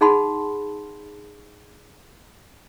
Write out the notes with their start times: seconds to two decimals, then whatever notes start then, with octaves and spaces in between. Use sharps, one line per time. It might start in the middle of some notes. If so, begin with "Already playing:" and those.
0.01 D#4 G#4 F#5 A5 B5 C6